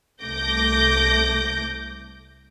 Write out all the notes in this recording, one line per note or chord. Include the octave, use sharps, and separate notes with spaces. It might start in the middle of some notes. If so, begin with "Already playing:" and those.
C2 A3 D6 G6 A#6